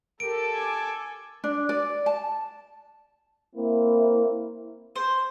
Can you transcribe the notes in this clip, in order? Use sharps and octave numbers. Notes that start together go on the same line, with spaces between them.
G4 A4 A#4 D7
G#5 D6
D4
D5
A5
A#3 C4 E4
C5